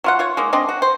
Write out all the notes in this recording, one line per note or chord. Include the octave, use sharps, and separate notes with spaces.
F#3 F4 F#5
F4 C#5 F#5
G#3 A#3 D#4
G#3 C4 D4 D#5
F#4
C5